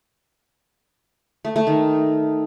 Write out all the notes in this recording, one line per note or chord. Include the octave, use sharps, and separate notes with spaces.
A3
A3
D#3